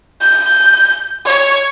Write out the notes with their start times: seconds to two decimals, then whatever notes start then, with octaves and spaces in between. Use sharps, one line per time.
0.21 G6
1.25 C#5